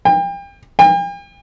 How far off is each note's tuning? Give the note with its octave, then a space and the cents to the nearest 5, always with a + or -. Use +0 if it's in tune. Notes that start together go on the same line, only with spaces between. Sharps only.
G5 +35
G5 +45